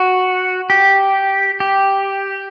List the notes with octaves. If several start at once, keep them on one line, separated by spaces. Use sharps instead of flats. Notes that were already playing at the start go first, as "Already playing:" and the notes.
Already playing: F#4
G4
G4